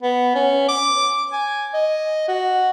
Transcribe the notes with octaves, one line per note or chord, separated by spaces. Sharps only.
B3
C#4
D6
G#5
D#5
F#4